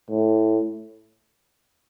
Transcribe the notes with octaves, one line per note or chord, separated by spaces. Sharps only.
A2